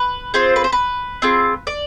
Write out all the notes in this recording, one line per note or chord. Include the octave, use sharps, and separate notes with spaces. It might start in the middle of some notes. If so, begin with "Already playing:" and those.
Already playing: B4
C4 F4 G#4 C5
B4
C5
B4
C4 F4 G#4
D5